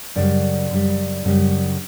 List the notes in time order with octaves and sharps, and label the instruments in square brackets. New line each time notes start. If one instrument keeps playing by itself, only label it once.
[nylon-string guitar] F#2 C#3 G3 D5
F#2 C#3 G3
F#2 C#3 G3